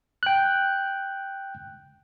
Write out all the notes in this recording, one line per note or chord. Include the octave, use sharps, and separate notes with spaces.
G5 F#6